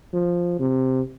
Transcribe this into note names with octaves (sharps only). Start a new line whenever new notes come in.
F3
C3